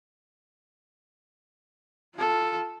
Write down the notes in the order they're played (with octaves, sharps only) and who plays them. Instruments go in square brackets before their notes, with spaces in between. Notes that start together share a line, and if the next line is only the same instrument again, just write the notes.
[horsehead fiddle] F4 A4